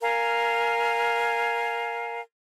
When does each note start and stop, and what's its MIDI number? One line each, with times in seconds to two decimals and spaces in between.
0.01 2.20 70
0.01 2.20 77
0.01 2.20 80